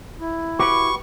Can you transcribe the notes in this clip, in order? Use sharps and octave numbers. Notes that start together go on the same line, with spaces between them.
E4
F#4 G4 B4 C#6 D6